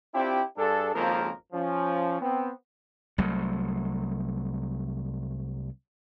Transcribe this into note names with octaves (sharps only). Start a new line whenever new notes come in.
C4 D4 E4 F4 G4
G2 D4 G#4 A4
G#1 F2 C#3 F3 A#3 A#4
F3 C#4
B3 C4
C2 F#3 A3